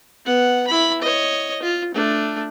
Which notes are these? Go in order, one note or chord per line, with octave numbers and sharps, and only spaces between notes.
B3 F#5
E4 B5
C#5 D#5
F4
A3 D4